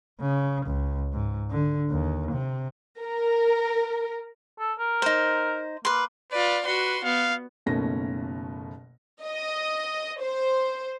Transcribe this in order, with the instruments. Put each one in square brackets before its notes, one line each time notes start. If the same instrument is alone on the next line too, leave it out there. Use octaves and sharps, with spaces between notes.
[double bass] C#3
C#2
G#2
D3
D#2
C3
[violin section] A#4
[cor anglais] A4
A#4
[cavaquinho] D#4 C5
[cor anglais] A#3 [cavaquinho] B4 C6
[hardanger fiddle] F4 D5 [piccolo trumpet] B4
[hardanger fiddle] F#4 C6 [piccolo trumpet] B4
[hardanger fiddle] B3 [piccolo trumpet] F5
[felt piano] F#1 B2 D#3 A3 C#4 A#6
[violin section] D#5
C5